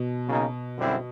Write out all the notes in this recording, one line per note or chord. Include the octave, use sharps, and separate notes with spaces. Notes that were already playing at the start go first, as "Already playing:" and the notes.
Already playing: B2
C#3 F#3 A#3 D#4
F#2 D3 G3 C4 E4